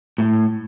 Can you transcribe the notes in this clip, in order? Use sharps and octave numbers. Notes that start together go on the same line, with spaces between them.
A2